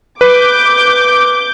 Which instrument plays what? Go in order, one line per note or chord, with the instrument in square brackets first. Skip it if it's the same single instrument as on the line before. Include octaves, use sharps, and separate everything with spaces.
[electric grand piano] B4 [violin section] D6 G6